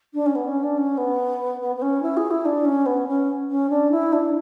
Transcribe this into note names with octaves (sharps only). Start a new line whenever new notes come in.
D4
C#4
B3
C#4
D4
C#4
B3
B3
B3
C#4
E4
G#4
E4
D4
C#4
B3
C#4
C#4
D4
E4
D4